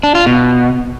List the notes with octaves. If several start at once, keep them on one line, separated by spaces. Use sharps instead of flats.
D4
F4
B2